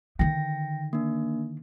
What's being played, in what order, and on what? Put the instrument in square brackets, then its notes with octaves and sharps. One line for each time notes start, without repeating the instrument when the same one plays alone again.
[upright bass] D3 D#3 [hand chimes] G5 A#6
[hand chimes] A#3 D4